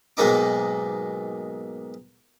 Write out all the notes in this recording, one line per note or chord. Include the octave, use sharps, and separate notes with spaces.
B1 G#2 G#3 A#3 D#4 D6